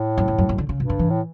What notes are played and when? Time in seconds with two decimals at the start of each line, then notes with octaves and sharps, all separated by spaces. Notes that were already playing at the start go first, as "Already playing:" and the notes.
Already playing: A2
0.17 F#2
0.28 E2
0.38 F#2
0.49 F#2
0.58 D3
0.69 C#3
0.80 G2 B2
0.90 D3
0.99 E3
1.10 A2